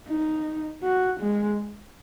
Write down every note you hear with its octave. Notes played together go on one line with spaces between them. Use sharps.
D#4
F#4
G#3